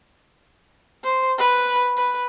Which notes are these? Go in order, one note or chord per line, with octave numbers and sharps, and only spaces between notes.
C5
B4
B4